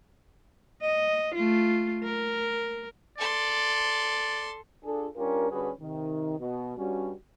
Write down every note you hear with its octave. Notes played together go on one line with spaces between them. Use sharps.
D#5
A3 F4
A#4
A4 D5 C6
D4 F4 G#4 A4
G3 C#4 D4 F4 G4 A#4
D3 G3 C#4 F#4 G#4 B4
C3 D#3
B2
G2 G3 C#4 F#4